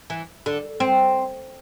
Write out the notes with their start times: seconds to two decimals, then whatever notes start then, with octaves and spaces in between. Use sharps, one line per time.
0.10 E3
0.46 D3
0.80 C4